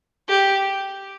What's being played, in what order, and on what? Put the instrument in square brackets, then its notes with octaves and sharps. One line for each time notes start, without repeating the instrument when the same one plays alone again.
[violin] G4